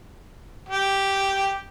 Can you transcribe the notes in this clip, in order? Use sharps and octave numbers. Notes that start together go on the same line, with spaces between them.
G4